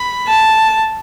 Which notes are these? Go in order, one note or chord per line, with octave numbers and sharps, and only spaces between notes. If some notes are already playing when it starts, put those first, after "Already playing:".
Already playing: B5
A5